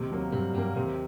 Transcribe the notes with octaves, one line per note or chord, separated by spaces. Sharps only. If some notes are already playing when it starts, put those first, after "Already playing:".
Already playing: D#2 C3 D#3
F#3 A#3
G2 C3 G3
G2 F#3 G3 A#3
D#2 C3 D#3